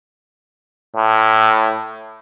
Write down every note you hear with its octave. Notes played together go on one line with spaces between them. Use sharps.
A2